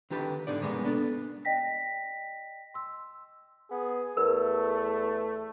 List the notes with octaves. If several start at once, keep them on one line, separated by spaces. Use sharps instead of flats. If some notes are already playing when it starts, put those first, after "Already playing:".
D3 D#3 G4 B4 A5
G#2 D3 D#4 D5
B1 G2 C#3 G#3 A#3 B3
B3 D4 A4
D5 D#5 G5 A#6 B6
C6 E6
B3 G#4
E2 A3 A#4 B4